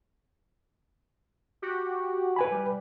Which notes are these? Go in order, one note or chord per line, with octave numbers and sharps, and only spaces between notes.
F#4 G4
B4 G#5 B5
G3